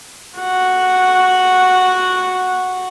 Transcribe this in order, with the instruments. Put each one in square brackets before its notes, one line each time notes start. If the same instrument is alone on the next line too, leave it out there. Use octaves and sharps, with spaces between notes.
[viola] F#4 F#5